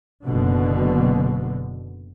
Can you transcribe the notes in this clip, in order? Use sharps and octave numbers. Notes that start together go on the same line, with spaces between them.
F#1 B2 D3